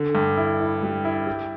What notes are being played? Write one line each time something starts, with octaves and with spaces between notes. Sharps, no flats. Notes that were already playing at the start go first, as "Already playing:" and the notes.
Already playing: D3
G2
E4
E4
G3
E4
G4